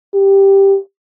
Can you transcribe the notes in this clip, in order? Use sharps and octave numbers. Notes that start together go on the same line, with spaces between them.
G4